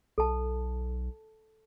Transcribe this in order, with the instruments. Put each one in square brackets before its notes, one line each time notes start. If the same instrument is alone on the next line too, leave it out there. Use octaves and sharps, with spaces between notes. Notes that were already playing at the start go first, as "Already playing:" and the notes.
[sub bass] B1 [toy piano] A4 A5